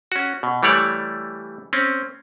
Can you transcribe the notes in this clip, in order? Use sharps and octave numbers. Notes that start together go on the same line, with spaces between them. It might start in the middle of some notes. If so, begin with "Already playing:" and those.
C#4 F#4
B2
E3 G3 A3 C#5 D5
C4 C#4